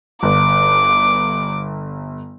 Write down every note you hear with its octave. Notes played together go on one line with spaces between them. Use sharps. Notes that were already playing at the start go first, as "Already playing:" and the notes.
G1 D6